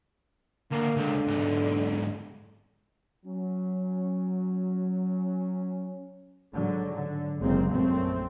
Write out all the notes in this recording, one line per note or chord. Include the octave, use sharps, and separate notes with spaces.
D2 A#3
C#2 D3
B1 G#2
F#3 C#4
G#2 D3 F#3
D3
F#1 F#2 C3 G#3 A#3 C4
A#1 F#2 A3 C4